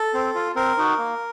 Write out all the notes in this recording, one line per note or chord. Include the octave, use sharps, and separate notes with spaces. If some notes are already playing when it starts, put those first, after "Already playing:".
Already playing: A4
C4
F4
C4 A#4
D#4 F#4
A#3